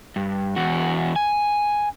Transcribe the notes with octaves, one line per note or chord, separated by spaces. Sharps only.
G2
E2 F#4
G#5